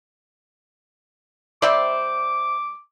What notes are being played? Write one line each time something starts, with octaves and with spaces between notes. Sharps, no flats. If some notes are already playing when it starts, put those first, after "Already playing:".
G3 C4 C5 D5 E5 D6